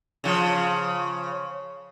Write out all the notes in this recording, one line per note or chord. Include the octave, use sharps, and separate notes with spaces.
C#3 F3